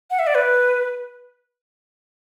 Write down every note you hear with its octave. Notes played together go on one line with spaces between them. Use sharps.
F#5
E5
D5
B4